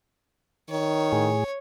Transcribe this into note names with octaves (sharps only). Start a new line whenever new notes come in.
D#3 C#5
A2 G#4